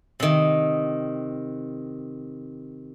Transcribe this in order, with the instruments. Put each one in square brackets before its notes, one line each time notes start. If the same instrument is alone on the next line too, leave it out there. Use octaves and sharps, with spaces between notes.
[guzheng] C3 D#3